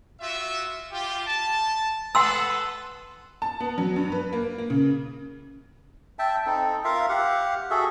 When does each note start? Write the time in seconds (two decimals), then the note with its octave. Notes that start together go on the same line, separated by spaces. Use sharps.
0.20 F4 F#4 E5
0.91 F4 G4
1.26 A5
2.15 A4 B4 F#5 C6 E6
3.42 A5
3.60 B3
3.78 F#3
3.96 G2
4.12 B4
4.33 A#3
4.58 A#3
4.70 C#3
6.19 E5 G5 A5
6.46 C4 D#4 A4
6.84 F4 A#4 E5 F5
7.09 G4 F5 F#5
7.71 F#4 G#4 A4 E5